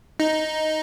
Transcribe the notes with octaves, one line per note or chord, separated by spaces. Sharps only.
D#4